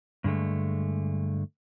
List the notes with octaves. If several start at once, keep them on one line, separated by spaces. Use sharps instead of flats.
G2 D3 G#3 A3